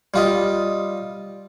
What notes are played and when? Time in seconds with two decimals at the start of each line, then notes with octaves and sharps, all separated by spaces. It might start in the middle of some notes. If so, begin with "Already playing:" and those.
0.14 G3 F4 D#5